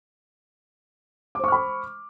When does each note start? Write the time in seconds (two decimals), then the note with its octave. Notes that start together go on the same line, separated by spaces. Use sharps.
1.35 D6
1.39 C5
1.44 C#6
1.48 F6
1.52 B5